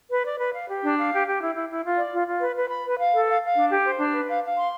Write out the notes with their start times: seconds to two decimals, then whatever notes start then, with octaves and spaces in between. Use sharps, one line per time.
0.11 B4
0.25 D5
0.39 B4
0.54 F5
0.68 G4
0.83 D4
0.98 F5
1.12 G4
1.26 G4
1.40 E4
1.54 E4
1.69 E4
1.83 F4
1.97 D5
2.12 F4
2.26 F4
2.40 B4
2.56 B4
2.69 B5
2.84 B4
2.98 F5
3.13 A4
3.28 F5
3.41 F5
3.56 D4
3.70 G4
3.85 C5
3.99 D4
4.13 B4
4.27 F5
4.42 F5
4.57 C6